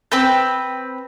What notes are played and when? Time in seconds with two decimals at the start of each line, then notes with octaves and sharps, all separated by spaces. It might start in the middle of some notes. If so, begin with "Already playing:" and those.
0.12 C4 B4 G6